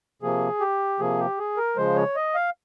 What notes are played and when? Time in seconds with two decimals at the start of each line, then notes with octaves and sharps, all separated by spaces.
0.22 C3 F3 A#3 G#4
0.60 G4
0.99 C3 F3 A#3 G#4
1.19 G4
1.38 G#4
1.57 A#4
1.77 C#3 F3 G#3 C5
1.96 C#5
2.16 D#5
2.35 F5